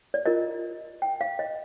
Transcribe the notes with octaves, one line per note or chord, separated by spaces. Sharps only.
D5
F4 A#4 D#5
G5
F5
D#5